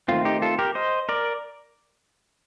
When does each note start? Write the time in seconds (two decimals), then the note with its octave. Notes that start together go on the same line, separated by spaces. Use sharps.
0.08 D#3 A3 C4 F4
0.25 D#4 G4
0.42 F4 A4
0.59 G4 A#4
0.75 C5 D#5
1.09 A#4 D5